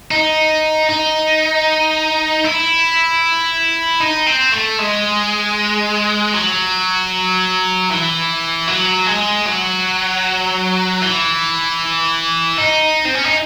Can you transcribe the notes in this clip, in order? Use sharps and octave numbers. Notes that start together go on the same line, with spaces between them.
D#4
D#4
E4
D#4
C4
A3
G#3
F#3
E3
F#3
G#3
F#3
E3
D#4
C4
C#4
D#4